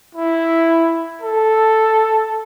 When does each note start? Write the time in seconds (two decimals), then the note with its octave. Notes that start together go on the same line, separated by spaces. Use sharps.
0.15 E4
1.22 A4